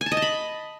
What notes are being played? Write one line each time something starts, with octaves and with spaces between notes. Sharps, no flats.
G#5
A5
D#5
A5
B5